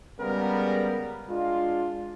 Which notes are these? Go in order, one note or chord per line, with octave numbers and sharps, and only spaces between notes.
C#3 G3 G#3 B3 A#4
G#3 D4 F4